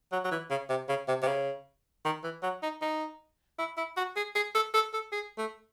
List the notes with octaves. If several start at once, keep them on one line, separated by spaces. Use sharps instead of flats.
F#3
F#3
E3
C#3
C3
C#3
C3
C3
C#3
D#3
E3
F#3
D#4
D#4
E4
E4
F#4
G#4
G#4
A4
A4
A4
G#4
A3